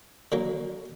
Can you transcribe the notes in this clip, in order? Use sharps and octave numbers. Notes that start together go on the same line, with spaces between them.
D3 F#3 A#3